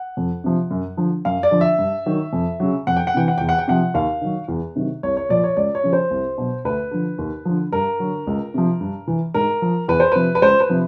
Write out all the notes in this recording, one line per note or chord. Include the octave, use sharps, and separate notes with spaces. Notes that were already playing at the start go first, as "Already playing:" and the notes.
Already playing: F#5
F2
C3 F3
F#2
D3 F3
F#2 F5
D5
D3 F3
E5
G2
D#3 F#3
F2
C#3 F#3
F2 F#5
G5
F#5
C3 E3 G5
F#5
E2 G5
F#5
G5
C3 F3 F#5
D#2 F5
D#3 F#3
E2
C3 D#3 F#3
C2 C#5
C#5
A#2 F3 D5
C#5
C#2 D5
C#5
C#3 F3
C5
C2
B2 F#3
D2 B4
D3 F3
D#2
D3 F3
G2 A#4
D3 F#3
C#2
C3 F3
G2
E3
G#2 A#4
F3
E2 B4
C5
C3 F3 B4
B4
C#2 C5
B4
C3 F3